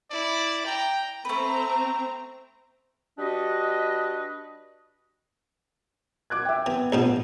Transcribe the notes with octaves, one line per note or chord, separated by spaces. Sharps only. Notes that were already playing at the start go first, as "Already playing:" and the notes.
E4 D5
G5 A#5
A3 C4 B4 A#5
G3 D4 F#4 B4 D#5
D6 F#6 G#6
E5 G5
E3 B3
D2 B2 F3